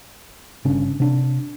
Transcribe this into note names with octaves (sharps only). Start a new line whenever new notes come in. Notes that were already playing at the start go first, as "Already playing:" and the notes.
G1 C#3 C#4 D4
C3 D4